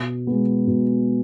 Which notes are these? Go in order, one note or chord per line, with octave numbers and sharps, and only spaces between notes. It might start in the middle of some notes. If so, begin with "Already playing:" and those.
Already playing: B2
G#3 B3
B2